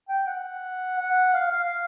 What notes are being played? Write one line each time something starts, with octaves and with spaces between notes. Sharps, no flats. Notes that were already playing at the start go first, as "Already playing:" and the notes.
G5
F#5
F#5
F5
F5